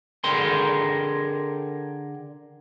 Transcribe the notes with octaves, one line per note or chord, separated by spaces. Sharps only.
D3 G#4 A#4 G5 C6